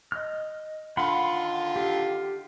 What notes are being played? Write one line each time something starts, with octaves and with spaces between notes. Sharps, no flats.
D#5 F6
D3 D#3 F4 F#5 B5 C6
G4